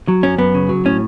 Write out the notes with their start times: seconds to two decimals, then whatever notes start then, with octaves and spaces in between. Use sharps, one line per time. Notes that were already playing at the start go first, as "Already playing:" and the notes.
0.08 F#3
0.23 F#2 C#4
0.38 F#2 B3
0.55 C#3
0.69 F#3
0.85 A2 C#4